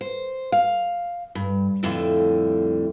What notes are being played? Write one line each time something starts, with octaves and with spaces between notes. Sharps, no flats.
C5
F5
G2
F2 A2 D3 G3 E5